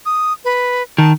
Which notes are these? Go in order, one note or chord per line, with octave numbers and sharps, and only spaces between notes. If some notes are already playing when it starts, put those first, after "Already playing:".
D#6
B4
D#3 A5